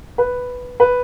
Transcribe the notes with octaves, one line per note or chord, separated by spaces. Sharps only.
B4
B4